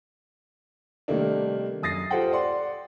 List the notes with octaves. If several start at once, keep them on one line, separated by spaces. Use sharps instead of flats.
C3 D#3 G3 A3 A#3 D4
F#2 D#6 A6 A#6 C7
F4 G4 A4 C5 F#5 G5
D5 F#5 C6